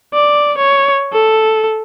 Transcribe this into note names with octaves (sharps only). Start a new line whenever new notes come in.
D5
C#5
A4